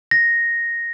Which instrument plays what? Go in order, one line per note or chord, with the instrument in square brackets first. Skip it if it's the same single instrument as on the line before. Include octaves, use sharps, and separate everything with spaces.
[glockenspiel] A#6